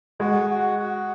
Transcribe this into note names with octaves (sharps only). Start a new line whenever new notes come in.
G#3 F#4
F#4
F#4